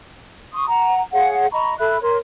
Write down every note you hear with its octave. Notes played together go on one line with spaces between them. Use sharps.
C6 C#6 D#6
F#5 A#5
G#4 C#5 F5 F#5
D#5 A#5 B5 C#6
A4 E5 B5 F#6
A#4 C#5 C6